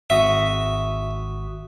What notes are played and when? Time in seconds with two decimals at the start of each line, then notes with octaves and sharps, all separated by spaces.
0.10 G#1 F#4 E5 D#6